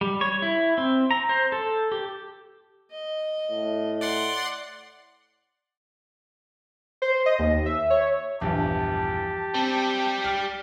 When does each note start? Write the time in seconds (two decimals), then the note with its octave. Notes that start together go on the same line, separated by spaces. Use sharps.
0.01 G3
0.21 C#5
0.42 E4
0.78 C4
1.11 A#5
1.29 C5
1.52 A4
1.92 G4
2.91 D#5
3.50 A2
4.01 D5 F#5 C6
7.02 C5
7.26 D#5
7.39 D#2
7.66 E5
7.90 C#5
8.41 A#1 E2 G2 G4 A5
9.54 G3 C4
10.24 F6 B6